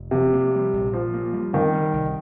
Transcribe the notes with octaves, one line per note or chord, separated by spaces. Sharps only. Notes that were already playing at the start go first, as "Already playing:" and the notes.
Already playing: F1
C3 F3
A#3
G3
A#1
A#2 F3
A#3
G3
D#3 C4
G3
C2